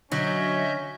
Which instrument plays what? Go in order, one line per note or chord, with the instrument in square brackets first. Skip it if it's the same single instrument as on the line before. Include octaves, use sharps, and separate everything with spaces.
[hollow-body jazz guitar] D3 [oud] F#3 [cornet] C#4 [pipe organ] D#5 E5 G6